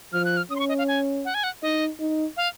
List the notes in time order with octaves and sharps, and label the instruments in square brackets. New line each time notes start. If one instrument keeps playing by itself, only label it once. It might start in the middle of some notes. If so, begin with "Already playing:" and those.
[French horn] F3 [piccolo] F6
[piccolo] F#6
F6
[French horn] C#4 [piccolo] D#6
[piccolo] C6
C#6
D#5
F5
G#5
F#5
G#5
F#5
[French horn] D#4 [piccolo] D#5
[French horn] D#4
[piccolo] F5